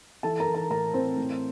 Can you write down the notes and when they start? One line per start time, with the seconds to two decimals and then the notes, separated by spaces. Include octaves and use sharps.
0.23 E3 A4 A5
0.40 A#4 A#5
0.48 E3
0.54 A#4 A#5
0.70 A2 A#4 A#5
0.93 E3 C4 C5
1.17 A2